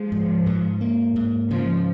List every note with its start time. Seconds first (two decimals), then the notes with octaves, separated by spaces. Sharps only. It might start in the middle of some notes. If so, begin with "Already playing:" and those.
Already playing: F3 G#3
0.12 G#2
0.46 G#2
0.81 A#3
1.16 G#2
1.50 C#3 F3